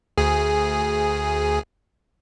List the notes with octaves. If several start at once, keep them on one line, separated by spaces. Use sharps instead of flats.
D2 G#4 G#5